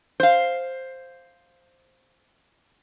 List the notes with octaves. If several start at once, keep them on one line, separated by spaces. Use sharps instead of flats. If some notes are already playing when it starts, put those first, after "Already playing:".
C5 F5